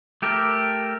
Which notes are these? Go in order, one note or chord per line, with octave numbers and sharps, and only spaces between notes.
A3 G4 A4 A#4